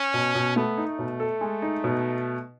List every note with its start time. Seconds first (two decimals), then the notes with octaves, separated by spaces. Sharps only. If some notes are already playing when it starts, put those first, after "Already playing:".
Already playing: C#4
0.14 B2
0.35 B2
0.56 A3 B3
0.77 D#4
0.88 A3
0.99 B2
1.20 A4
1.41 G#3
1.62 D#4
1.84 B2